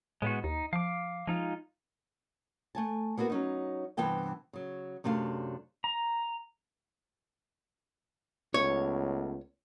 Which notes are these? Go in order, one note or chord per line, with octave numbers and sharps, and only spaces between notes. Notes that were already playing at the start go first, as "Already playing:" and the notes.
A2 G#3 B3 F#4
D#2 D#4
F3 F5 D6
F3 G#3 D#4 F4
A3 G#5 A5
A#3 B3 E4 F#4 B4
F#3 C#4 D#4
G2 C3 E3 B3 G5 A5
C#3 F#3
F#2 C3 A3 D4 F5
A#5
C#2 A3 B3 C#5